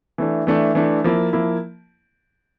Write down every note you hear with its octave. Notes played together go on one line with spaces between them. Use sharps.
E3 A3 D4
E3 A3 D4
E3 A3 D4
F3 A#3 E4
F3 A#3 E4